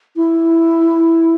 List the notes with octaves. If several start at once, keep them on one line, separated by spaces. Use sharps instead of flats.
E4